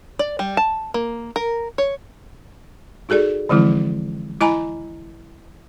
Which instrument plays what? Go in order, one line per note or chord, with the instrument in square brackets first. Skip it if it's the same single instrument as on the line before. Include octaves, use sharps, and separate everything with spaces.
[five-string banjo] D5
G3
A5
A#3
A#4
C#5
[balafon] D#4 F#4 G#4 A4 D5
D3 E3 F3 G#3 C4 E4
E4 D#5 G#5 A#5 B5